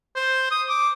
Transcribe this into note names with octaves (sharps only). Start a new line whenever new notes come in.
C5
D#6
D6